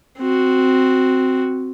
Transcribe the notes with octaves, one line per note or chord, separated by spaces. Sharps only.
C4 F#4